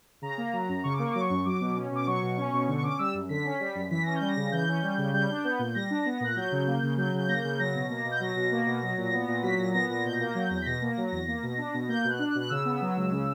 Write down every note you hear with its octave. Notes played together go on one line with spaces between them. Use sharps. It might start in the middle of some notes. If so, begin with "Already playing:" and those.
C#3 A#5
A#3
F#3
F#2
C#3 C#6
D6
A#3 C#6
F#3 D6
C#6
F#2
F#3 D6
B2
C#4
B2 D6
F#3 C#6
B2
C#4
B2
D3 C#6
C#6
C#4 D6
G3 E6
F#2
D3 B6
C#4
G3
F#2
E3 B6
C#4 A#6
G6
G3
A#6
C#3
E3 G6
C#4
G3
C#3
G3 G6
D4
B3
A#2
G3 A#6
D4
B3
A#2 F#6
F#3 G6
C#3
A#3
C#3
F#3 G6
C#3 G6
A#3 A#6
G6
C#3
F#3 A#6
B2
A#3
B2
G6
F#3 A#6
B2
A#3
B2
F#3
A#2
B3
A#2
F#3 B6
A#2 A#6
B3 A#6
A#2 A#6
B2 G6
A#6
A#3 G6
A#6
F#3 G6
E2 A#6
G6
B6
B2 A#6
A#3 A#6
F#3
E2 A#6
A#3
B2
D4
B2
A#3 G6
B2
F#6
D4
F#6
B2
F#6
C#3 E6
B3
F#3
C#2
C#3